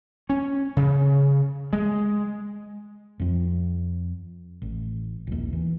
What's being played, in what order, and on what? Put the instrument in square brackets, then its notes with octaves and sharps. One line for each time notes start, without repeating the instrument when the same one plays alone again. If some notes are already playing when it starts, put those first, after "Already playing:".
[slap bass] C#4
C#3
G#3
[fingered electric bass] F2 F3
A1
A#1 D#2
E3